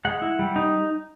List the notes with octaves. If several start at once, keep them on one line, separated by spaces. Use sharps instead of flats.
G#3 F#5
E4
G3
D#4